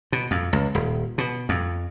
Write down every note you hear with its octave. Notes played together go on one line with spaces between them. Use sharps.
B2
F2
C#2
D#1
B2
F2